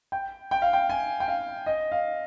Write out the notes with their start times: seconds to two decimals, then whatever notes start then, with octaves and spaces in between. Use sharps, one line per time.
0.12 G5
0.51 G5
0.62 F5
0.73 G5
0.90 G#5
1.20 G5
1.28 F5
1.66 D#5
1.92 F5